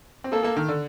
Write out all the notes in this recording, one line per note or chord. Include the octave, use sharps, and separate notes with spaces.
C4
A#3 A4
A#3
D#3
D3